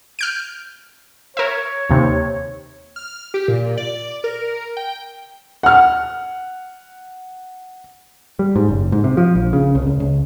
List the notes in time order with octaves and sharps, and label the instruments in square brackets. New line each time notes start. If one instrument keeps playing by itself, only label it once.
[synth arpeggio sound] F6 G6 D7
[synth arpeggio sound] A#4 E5 [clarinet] C#5
[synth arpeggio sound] D#2 C3
[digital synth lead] F6
G4
A#2
D5
A#4
G5
[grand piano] F#5 F6
[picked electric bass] G3
G#2
F#1
G#2
C3
F3
A#1
C#3
C2
C#2
C#2